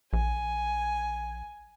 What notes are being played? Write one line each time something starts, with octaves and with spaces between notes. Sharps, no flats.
A#1 G#5